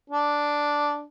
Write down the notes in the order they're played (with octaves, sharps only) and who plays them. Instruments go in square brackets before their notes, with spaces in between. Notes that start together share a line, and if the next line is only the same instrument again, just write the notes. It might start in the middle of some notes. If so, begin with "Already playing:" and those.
[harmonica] D4